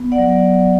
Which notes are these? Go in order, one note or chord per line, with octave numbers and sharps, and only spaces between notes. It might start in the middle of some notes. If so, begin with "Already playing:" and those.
Already playing: B3
D5 F#5
F#3